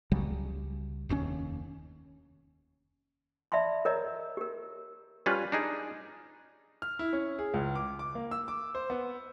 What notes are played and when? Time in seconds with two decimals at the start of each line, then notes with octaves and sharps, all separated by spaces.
0.12 C#2 C#3 F#3 G3
1.09 F1 D#2 B2 C#4
3.52 D5 E5 A5 B5 C6
3.85 A#4 C#5 D#5 A#5
4.37 G4 A#4
5.26 G3 C#4 F4 B4
5.52 D4 D#4 G#4
6.82 F6
6.99 E4
7.13 C#4
7.39 G#4
7.54 C#2
7.75 D6
7.99 D6
8.15 A#3
8.31 E6
8.48 D6
8.75 C5
8.90 B3